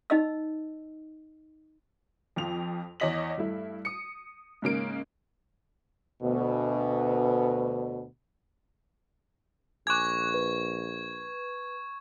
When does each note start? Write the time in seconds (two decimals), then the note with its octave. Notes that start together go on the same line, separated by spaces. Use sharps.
0.10 D#4 D#5 E6
2.36 F2 F3 F7
3.00 E2 C#5 D#5 B6 F#7
3.37 G2 A3 E4
3.85 D#6 C#7
4.62 G#2 C#3 A#3 D7
6.22 D2 B2
9.87 A#1 G#5 C#6 D6 F#6 G#6
10.34 B4